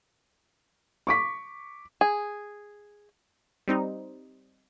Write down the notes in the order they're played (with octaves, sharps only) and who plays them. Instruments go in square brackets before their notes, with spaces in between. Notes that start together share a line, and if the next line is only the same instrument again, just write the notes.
[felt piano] C#6 D6 B6
[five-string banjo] G#4
[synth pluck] G3 C4 D#4